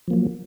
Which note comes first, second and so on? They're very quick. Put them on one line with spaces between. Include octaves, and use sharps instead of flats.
F3 A#3 F#3